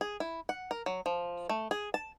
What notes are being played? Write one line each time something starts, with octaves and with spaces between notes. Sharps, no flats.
G#4
E4
F#5
A#4
F#3
F3
A3
G#4
A5